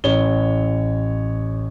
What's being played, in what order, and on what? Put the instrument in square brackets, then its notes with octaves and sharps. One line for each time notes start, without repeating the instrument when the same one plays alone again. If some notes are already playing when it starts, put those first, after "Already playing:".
[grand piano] A1 C#5 G7